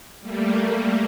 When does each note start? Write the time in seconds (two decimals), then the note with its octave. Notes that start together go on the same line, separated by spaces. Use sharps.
0.21 G3 A3 A#3